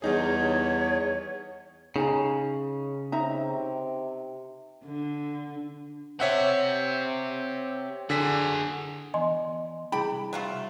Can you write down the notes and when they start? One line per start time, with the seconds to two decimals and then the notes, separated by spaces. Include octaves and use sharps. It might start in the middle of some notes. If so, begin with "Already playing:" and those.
0.02 E2 G3 D#4 G#4 C#5
1.96 C#3 D#4 G#5 A#5
3.12 C3 D#4 E5 A#5
4.85 D3
6.20 C4 G4 C#5 E5 F#5
8.10 D3 F#4 G#4 B6
9.14 E3 B3 D5 D#5 G#5 C6
9.92 C3 G3 D4 E4 G#4 G5 B5
10.33 F#3 A3 F4